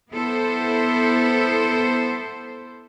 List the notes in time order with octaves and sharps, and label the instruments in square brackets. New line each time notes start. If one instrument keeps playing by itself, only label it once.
[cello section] B3 E4 A4 C5